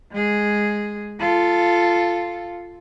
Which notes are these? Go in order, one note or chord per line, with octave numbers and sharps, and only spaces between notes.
G#3 G#4
F4 A4